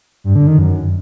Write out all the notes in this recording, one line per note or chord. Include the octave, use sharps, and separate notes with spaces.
G2
D3
D#3
F#2